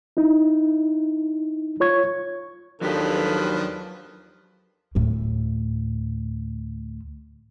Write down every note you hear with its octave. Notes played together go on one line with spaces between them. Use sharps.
D#4 E4
F4 C#5 C#6 G#6
D#2 D#3 F3 F#3 D4 G4 A4 B4
D2 A2